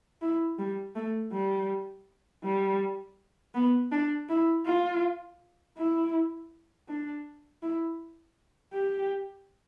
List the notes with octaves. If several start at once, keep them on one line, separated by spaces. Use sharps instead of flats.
E4
G3
A3
G3
G3
B3
D4
E4
F4
E4
D4
E4
G4